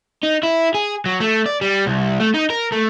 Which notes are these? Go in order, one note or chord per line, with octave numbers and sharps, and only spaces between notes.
D#4
E4
G#4
F#3
A3
D5
G3
C2
A3
D#4
A#4
A3